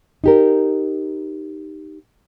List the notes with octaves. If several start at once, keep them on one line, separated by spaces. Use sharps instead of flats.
D#4 G4 A#4